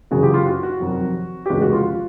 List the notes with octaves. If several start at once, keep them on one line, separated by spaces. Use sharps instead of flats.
F#1 F#2 C#3 E3 F#4 G#4
F4 G4
F4
F#4
F#4
F2 C3 D#3 F#3
G4
F1 D#2 C#3 E3 G#3 F#4
F#4
F4